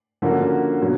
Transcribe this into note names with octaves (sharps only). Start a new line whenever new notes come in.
D3 F3 A#3 C#4 F#4
B2 F#3